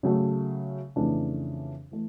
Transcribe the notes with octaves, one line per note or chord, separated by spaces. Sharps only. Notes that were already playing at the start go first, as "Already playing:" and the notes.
C#3 F#3 A3
F2 C#3 E3 A3 D4
E3 A3